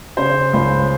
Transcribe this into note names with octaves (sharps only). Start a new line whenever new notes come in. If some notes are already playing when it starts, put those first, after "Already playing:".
C#3 C5
C#2 C5